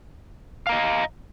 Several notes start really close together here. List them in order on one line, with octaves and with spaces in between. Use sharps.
F5 A#5 D#5